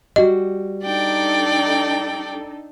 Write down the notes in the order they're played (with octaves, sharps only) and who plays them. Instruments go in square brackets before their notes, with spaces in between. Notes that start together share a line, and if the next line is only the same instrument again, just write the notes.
[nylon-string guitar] G3 F#4 [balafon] D#5
[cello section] D4 D#4 A4 [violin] D5 G5